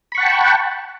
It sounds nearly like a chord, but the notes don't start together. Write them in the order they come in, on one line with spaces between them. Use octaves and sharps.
B5 C#6 F#5 A5 G5